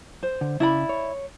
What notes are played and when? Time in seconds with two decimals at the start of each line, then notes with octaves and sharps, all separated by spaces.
0.23 C5
0.41 D3
0.60 C#3 E4 D5 B5
0.89 C#5